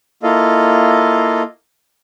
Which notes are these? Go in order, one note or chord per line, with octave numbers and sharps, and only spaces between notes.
A#3 E4 F4 A4 D#5 F5